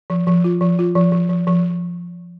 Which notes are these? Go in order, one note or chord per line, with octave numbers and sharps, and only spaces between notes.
F3
F3
F4
F3
F4
F3
F3
F3
F3